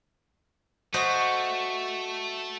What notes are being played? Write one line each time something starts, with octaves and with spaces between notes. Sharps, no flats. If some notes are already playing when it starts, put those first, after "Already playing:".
A3 F#4 C5 D#5